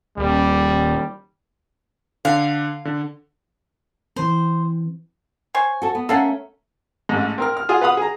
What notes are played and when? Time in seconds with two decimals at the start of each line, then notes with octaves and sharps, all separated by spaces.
0.18 D#1 D#2 G3
2.25 D3 F5
2.85 D3
4.16 E3 C4 C5
5.55 C5 C#5 G#5
5.82 F#4 A4
5.95 B3
6.09 A3 C#4 A4 A#4 F5 F#5
7.09 A1 G#2
7.38 C4 A#4 F6
7.57 F6
7.69 F4 G#4 F#5 D#6
7.81 B4 F5 F#5 B5 D#6
7.97 G#4 A#5